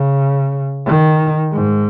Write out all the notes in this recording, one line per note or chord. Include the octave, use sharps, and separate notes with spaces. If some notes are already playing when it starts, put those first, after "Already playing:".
Already playing: C#3
D#3
G#2